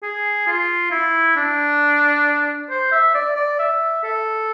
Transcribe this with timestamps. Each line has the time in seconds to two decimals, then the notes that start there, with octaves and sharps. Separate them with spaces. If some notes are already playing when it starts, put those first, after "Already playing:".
0.03 G#4
0.47 F4
0.91 E4
1.36 D4
2.70 C5
2.92 E5
3.14 D5
3.36 D5
3.59 E5
4.04 A4